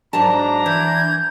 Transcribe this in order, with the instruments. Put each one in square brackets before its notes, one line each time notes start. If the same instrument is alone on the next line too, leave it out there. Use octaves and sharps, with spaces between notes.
[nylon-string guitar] G#2 F#3 A5 [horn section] D4 A#5
[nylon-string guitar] E3 [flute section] G6 G#6